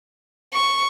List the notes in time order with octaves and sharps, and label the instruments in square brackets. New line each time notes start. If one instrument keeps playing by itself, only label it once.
[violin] C#6